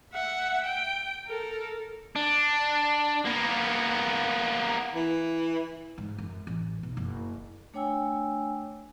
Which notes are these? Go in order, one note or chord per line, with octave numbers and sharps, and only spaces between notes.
E5 F#5
G5
A4 A#4
D4
A#3 B3
E3
G#2
F#2
A1
B1
F#1
A3 D4 C#5 G5 G#5 E6